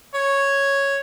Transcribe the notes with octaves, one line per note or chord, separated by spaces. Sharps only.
C#5